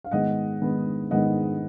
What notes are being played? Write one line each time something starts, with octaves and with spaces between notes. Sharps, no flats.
F5
G#2 D#3 G#3 B3 D#5 F#5
G#2 D#3 G#3 B3
G#2 D#3 G#3 B3 D#5 F#5